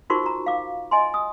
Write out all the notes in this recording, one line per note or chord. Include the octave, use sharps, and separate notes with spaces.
D#4 F4 F#4 A#4 C5 C#6
F#4 A#5
F5 D6
D#5 G#5 C6
D#6